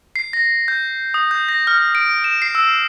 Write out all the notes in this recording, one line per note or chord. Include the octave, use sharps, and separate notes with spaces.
C7
A#6
G6
D#6
G6
A#6
F6
D7
E7
C7
E6